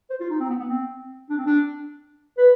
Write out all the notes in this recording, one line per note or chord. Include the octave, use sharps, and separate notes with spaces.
C5
F4
D#4
C4
B3
B3
C4
D4
C4
D4
B4